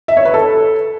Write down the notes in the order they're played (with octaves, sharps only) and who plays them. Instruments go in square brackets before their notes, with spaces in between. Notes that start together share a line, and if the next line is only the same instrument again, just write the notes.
[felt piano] E5
C#5
B4
A4